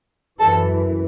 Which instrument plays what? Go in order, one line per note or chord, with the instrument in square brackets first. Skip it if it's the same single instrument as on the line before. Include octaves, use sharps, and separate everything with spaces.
[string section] F#2 E3 A4